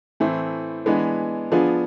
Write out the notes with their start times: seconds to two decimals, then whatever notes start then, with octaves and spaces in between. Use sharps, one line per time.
0.20 A2 E3 A3 C4
0.86 E3 G#3 B3 D4
1.51 F3 B3 D4 F4 G#4